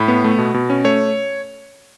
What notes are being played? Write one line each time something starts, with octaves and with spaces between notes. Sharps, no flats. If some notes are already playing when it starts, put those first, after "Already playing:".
Already playing: A2 B5
B3
A3
B2
B2
C#4
A3 C#5